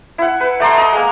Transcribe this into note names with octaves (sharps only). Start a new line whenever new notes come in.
E4 F#5
B4
A3 D5 A#5 C6
D#5 A#5
G#3 A#3